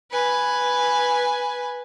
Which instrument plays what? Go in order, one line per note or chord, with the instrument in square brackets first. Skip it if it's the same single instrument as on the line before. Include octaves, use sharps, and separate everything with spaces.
[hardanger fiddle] B4 G#5